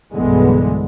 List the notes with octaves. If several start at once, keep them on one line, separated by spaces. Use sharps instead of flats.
B1 G2 D3 E3 G#3 B3